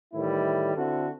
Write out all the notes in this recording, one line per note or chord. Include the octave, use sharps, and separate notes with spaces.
A2 D#3 E3 G3 E4
D3 C4 E4 F#4 A4